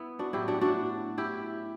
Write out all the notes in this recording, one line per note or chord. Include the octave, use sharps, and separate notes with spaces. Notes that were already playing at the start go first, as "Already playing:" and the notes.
Already playing: B3 E4
D4 F#4
A2 F#3 E4 G4
D4 F#4
D4 F#4
E4 G4